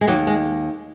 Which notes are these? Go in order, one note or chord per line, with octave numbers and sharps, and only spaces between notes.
G#3
D#2 F#3
G#3